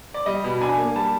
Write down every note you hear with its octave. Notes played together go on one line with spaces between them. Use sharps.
D5
G3 D#5
B2
D4 G#5
A#3
G3 A5